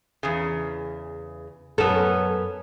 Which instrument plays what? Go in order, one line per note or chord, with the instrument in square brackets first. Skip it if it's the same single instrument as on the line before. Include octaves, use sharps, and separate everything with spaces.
[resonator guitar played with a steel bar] E2 C#3
[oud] F#2 A4 [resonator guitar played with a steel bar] B3 C#4